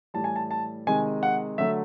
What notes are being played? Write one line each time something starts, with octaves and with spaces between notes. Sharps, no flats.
A2 E3 G3 A5
G#5
A5
A5
C3 D#3 G#3 G#5
F#5
D3 F#3 A3 E5